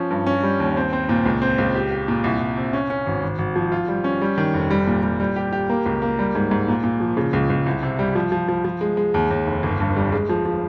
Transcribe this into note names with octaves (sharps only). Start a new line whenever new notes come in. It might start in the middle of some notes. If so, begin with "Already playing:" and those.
Already playing: F3 C#4
G2
C#4
G3
D#2
C4
C4
A#2
C#2
C4
C#2
G4
G4
A#2
C2
C2
C3
C#4
C#4
G#1
G#1
G#1
F3
F4
G3
C#4
G3
D#3
F1
G3
A#2
G3
G3
G4
G4
A#3
C#2
A#3
G3
G#2
G#2
A#2
A#2
F3
C#3
C#2
C#2
C2
C3
G3
F3
F3
F3
F3
G#3
G#3
D#2
D#2
F1
G1
G2
G3
G#3
F3
F3